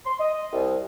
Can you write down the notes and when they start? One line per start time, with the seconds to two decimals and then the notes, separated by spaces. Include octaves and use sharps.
0.06 C6
0.19 D#5
0.53 C2